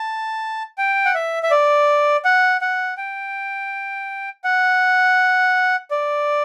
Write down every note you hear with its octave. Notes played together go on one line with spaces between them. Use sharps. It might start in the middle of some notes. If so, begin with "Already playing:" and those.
Already playing: A5
G5
F#5
E5
E5
D5
F#5
F#5
G5
F#5
D5